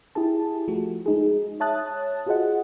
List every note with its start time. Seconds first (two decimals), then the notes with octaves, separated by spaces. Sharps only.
0.15 E4 G4 G#4 A5
0.68 F3 A3 F#4
1.06 G#3 D#4 G#4
1.60 C#5 E5 A5 D#6 F#6 A6
2.26 F4 F#4 G#4 C5 D#5 F#5